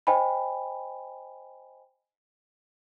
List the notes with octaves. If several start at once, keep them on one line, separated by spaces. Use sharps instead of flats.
C5 D#5 G5 G#5 B5